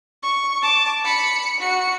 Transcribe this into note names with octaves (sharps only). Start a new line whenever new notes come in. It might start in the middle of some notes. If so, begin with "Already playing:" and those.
C#6
A5 D6
B5 C#7
F#4 C#7